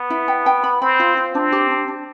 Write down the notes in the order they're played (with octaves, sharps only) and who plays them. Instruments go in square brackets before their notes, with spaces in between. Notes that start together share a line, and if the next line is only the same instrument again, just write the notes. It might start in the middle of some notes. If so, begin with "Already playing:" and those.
Already playing: [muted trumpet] B3
[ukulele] E4
G5
G5
B5
[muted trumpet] C4 [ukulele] B5
[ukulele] F4
F4
[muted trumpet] C4 [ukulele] D4
[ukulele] G4
D4
D4